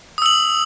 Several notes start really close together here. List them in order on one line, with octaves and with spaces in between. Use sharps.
D#6 E6 F#7